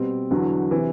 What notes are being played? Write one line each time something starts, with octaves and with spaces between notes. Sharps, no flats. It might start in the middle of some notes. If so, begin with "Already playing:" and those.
Already playing: B2 G3 C4
E2 D3 F#3
C3 E3